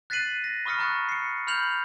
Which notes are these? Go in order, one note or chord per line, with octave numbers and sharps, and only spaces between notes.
F#6 A6 B6 C7 D#7 F#7
A#6
B5 C#6 D#6 F6 A#6 C#7
A#5 C#6 D#6 F#6 A6
C7 C#7
B5 F6 G6 C7 F7 F#7